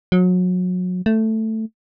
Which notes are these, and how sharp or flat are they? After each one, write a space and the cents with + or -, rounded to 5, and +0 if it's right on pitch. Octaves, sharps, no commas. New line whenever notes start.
F#3 -30
A3 +5